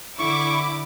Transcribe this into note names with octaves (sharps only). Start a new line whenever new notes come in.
D3 E4 C#6 D6